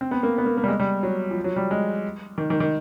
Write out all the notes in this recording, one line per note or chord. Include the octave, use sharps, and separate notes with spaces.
C4
B3
A#3
B3
A#3
A#3
G3
G#3
G3
F#3
F3
F#3
G3
G#3
D#3
D#3
D#3